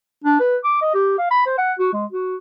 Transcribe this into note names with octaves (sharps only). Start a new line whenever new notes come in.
D4
B4
D6
D#5
G4
F5
B5
C5
F#5
F#4
G#3
F#4